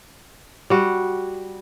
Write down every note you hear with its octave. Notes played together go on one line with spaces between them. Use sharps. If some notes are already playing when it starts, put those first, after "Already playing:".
G3 F#4